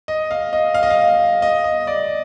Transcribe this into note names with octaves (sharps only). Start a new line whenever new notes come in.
D#5
F5
D#5
F5
D#5
F5
D#5
D#5
D5